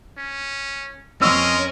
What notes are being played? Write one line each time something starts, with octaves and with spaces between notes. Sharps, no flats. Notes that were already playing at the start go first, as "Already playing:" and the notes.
C#4
F2 C#4 A#4 D#5 C6 C#6 E6 F6